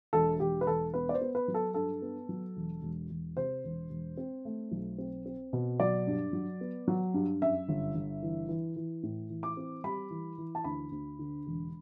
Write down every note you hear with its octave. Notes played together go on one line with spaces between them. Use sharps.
E1 A4
E1 G4
B4
E1 A4
B3 B4
D5
C5
B3
B4
F#3
A4
G2 A4
B3
F#3
E1
E1
E1
C3 C5
E1
E1
C4
A3
B1
C4
C4
B2
F#3 D5
G2
F#3
B3
F#3
G2
F#2 E5
G1
G1
E3
E3
E3
A2
E3
D6
C4
G3 B5
E3
E3
A5
D2 B5
D2
D3
E1